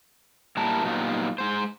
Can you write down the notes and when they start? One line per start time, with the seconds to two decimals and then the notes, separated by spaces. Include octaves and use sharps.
0.57 A#2 G3 E4 A#4 A5
0.84 A#2 F#3 G3 B3 D#4 F4
1.38 G#3 C5